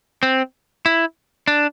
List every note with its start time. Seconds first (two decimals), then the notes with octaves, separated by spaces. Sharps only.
0.23 C4
0.86 E4
1.48 D4